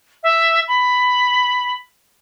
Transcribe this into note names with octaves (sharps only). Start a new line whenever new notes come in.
E5
B5